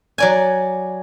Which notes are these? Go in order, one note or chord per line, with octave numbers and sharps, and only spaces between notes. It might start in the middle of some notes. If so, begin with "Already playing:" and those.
F#3 D5 G#5